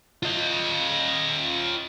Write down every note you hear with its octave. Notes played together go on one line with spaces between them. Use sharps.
F4 D#5